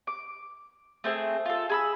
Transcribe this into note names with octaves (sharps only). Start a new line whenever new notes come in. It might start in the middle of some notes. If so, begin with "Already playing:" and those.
D6
A3 C4 G#4
F4 A4
G#4 B5 E6